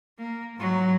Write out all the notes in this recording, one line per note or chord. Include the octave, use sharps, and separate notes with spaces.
A#3
G#2 F#3